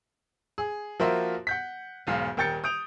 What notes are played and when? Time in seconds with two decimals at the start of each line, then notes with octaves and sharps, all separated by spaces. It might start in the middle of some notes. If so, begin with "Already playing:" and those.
0.58 G#4
0.99 F3 A#3 F#4 A#4 C5 E5
1.47 F#5 G6 B6
2.07 E1 B1 G#2 F5
2.37 D#1 A#4 G5 G6 A6 C#7
2.64 D#6 G6 D7 F7